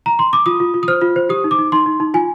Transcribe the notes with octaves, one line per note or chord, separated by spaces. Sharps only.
A#5
C6
D6
F4 D#6
F4
F4
D#6
C5 F6
F4
C5
G4 D#6
D#4
D6
D#4
D#4 C6
D#4
D#4
F4 G#5